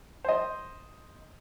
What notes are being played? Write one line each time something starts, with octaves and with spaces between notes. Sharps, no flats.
C5 D#5